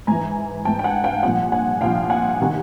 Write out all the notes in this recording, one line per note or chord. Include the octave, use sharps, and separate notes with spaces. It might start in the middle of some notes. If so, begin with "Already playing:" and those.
G#2 E3 G#5 A#5
G#2 E3 G5 A5
G5
F#5 G#5
F5 G5
C2 A#2 F3 F#5 G#5
F#5 G#5
C2 A#2 F3 F5 G5
F#5 G#5
C3 D#3